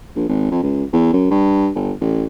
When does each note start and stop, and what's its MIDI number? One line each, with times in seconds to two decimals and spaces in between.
0.15 0.27 34
0.29 0.48 32
0.51 0.61 41
0.63 0.84 37
0.93 1.08 40
1.13 1.28 42
1.31 1.70 43
1.75 1.92 31
2.01 2.25 33